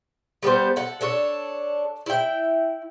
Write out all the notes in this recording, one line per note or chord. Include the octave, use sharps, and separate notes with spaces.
G3 B3 A4 C5
A4 F#5
D4 A4 C#5
E4 G5